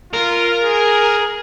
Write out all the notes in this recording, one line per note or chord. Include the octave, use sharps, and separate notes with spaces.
F4 A#4
G#4